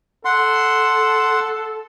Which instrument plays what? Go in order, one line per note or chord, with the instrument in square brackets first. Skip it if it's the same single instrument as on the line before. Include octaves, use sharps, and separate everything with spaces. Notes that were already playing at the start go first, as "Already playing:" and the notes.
[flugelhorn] A4 [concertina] F#5 C6